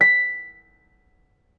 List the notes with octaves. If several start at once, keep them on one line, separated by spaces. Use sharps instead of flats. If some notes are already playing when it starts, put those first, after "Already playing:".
B6